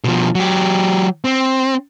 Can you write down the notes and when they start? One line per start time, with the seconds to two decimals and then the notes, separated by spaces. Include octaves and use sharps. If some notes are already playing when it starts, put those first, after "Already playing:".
0.04 B2 F3
0.35 F#3 G4
1.25 C4